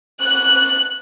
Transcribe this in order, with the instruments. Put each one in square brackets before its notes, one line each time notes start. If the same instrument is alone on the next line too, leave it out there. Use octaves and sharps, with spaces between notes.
[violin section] F#6